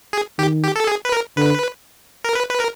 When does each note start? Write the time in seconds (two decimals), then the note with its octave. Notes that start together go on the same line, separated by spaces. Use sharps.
0.13 G#4
0.38 D#3 G4
0.63 G4
0.76 A4
0.87 G#4
1.05 B4
1.12 A#4
1.37 D3 B4
2.25 A#4
2.35 B4
2.50 B4
2.60 A#4